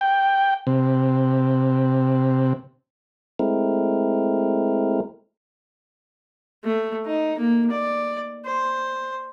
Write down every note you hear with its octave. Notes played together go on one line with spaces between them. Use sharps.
G5
C3
G#3 A3 C4 E4 A#4
A3
D#4
A#3
D5
C5